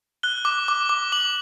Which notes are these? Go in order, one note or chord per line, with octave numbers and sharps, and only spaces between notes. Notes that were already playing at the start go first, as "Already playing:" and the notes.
F#6 G7
D6
D6
D6
D6 F#7